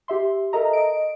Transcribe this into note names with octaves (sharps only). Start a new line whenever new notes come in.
G4 E5 C6
A4 A#4 D#5 E5 A#5
D#5 D7